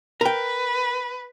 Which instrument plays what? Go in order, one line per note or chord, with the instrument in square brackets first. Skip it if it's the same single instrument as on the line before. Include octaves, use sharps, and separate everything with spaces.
[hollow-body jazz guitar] A#4 G5 [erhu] B4